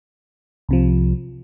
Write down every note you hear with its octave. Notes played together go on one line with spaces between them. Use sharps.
C2 C3 F3